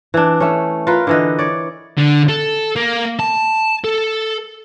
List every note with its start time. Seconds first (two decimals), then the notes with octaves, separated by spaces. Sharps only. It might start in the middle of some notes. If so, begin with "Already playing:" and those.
0.14 E3 D4
0.40 A3 C#4
0.87 F4 A#4 B4
1.07 D3 E3 D#5
1.39 C#5 D5
1.98 D3
2.29 A4
2.76 A#3
3.20 A5
3.84 A4